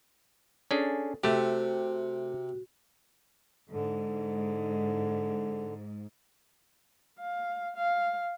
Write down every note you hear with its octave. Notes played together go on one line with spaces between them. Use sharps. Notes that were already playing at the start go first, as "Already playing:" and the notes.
C#4 D4 G#4 A4
C3 A3 F#4 G4
G#2 D3
F5
F5